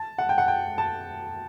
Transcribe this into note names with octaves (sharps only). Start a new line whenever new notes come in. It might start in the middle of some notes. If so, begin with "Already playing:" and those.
Already playing: A5
F#5
G5
F#5
G5
A5